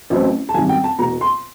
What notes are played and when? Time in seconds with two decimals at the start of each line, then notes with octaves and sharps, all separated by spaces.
0.10 A1 A2 F#3 A3 C4
0.49 A5
0.54 G#1 F#2 D#3 G3 G#5
0.69 G5
0.84 A5
0.98 E1 E2 B2 A#5
1.21 C6